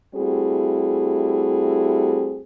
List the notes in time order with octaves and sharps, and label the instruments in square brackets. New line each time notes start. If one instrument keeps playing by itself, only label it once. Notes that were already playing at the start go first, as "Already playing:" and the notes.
[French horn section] G3 A3 C4 E4 F#4 G#4